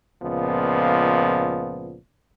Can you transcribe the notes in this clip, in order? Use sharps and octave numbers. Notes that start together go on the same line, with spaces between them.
C#2 A#2 F3 B3